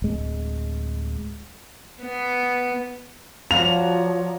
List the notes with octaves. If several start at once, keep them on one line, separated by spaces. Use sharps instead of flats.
D1 G#3
B3
F3 F#4 C#5 D5 F5 A#5 F7